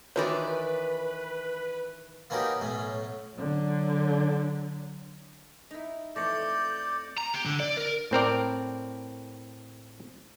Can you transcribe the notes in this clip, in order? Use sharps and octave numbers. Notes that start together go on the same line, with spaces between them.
D#3 E3 F4 F#4 B4 C#5 D5
A#3 B3 C#4 D#4 F#4 G4
B1 A2 C#4
D3 F#3
D#4 E4
F2 E3 A3 D5 D6 G6 A#6 C#7
A#5
G4
D3
D5
A#4
A2 C4 A#4 D5